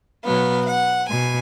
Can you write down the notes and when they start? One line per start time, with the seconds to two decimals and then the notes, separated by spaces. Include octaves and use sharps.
0.25 B2 F#3 B3 F5
0.67 F#5
1.09 B2 G#5